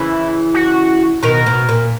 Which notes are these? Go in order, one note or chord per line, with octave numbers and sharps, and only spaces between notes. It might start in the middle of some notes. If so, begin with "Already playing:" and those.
Already playing: C#3 E3 E4
F#4
B2 D#3 A#4
B2
A#2